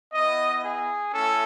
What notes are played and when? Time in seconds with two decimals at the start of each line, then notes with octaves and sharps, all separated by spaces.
0.13 B3 E4 D#5
0.63 G#4
1.13 A3 C#4 E4 A4